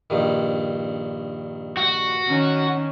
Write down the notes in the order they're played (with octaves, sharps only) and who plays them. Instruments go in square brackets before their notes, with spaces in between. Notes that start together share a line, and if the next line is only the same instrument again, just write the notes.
[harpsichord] A#1 G2 D#3
[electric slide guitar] F#4
[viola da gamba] D#3 C#4